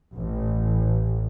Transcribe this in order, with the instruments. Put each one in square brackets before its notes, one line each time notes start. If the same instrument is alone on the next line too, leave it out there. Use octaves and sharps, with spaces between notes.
[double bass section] A1